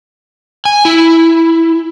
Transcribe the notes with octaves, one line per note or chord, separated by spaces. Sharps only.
G#5
E4